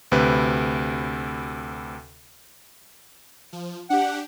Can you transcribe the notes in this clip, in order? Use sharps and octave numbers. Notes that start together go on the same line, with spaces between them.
D2 C3 B4
F3
D4 G4 F#5